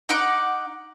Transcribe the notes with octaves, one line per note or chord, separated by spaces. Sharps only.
D#4 F#5 D6